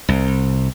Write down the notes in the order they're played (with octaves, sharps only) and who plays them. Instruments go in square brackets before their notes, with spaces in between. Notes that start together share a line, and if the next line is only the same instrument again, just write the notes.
[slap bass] C2